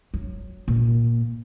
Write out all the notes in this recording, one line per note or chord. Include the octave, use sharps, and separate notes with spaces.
F#3
A#2